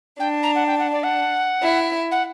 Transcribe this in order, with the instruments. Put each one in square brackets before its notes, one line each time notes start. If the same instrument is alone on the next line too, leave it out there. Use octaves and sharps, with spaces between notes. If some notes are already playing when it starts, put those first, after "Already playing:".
[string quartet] D4 [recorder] G5
[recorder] A#5
F#5
G5
F#5
D5
F#5
[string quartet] E4
[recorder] F#5